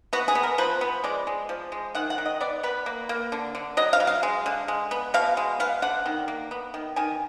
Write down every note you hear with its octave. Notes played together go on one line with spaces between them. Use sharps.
B3 F#4
G#4
B3
A#4
F3 B4
B3
G#3 D5
G#3
F3
G#3
D#3 F#5
F#5
D#3
D#5
B3 D5
B3 B4
A#3
A#3
D3
D3
F#3 D#5
F5
F#3
F5
G#3
D3
G#3
B3
B2 F5
G#3
B3 F5
D3 F#5
D#3
A#3
B3
D#3
D#3 G#5